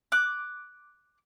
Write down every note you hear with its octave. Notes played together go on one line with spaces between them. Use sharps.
D6 F#6